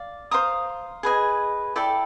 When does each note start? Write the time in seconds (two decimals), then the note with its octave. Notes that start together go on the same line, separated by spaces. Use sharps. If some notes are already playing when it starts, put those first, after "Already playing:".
Already playing: D5 F5
0.31 C5 F5 A#5 D#6
1.03 G#4 B4 D#5 G#5
1.76 E4 A4 D5 G5